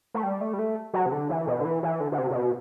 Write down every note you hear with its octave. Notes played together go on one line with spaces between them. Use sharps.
A3
G3
A3
G3
A3
F#3
C3
D3
E3
B2
D3
E3
E3
D3
D3
C3
C3
B2